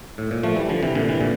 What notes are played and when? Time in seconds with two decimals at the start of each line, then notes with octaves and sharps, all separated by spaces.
0.18 A2
0.31 A#2
0.43 F3 A3
0.56 E3 G3
0.69 D3 F3
0.83 C3 E3
0.95 A#2 D3
1.08 C3 E3
1.21 A#2 D3